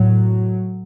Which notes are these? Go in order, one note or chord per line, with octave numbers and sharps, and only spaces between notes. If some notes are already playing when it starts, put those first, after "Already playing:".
Already playing: A2 F#3